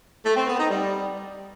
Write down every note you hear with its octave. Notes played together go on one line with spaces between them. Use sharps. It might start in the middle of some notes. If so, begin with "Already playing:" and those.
A3
C4
B3
D#4
G3